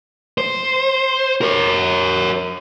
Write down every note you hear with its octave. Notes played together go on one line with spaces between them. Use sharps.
C5
A#4 C#5